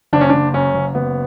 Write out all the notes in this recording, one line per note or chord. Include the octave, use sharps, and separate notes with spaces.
F#1 D4
C#4
F#1 D4
F#2 C#4
F#1
F#1 B3